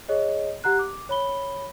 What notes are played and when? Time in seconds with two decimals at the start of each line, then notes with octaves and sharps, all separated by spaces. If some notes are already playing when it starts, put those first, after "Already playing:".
0.08 G#4 C#5 D#5
0.64 G4 F#5 A#5 F#6
0.79 D6
1.09 C#5 B5 G7